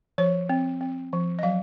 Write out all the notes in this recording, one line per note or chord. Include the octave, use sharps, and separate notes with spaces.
F3 C#5
C4
C4
F3
D#5
F#3 F5